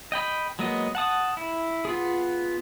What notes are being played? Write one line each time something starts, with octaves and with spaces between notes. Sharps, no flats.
D#5 G5 B5
F#3 G#3 A#3 B3 D#5
F#5 A5 D#6
E4
B3 F4 G#4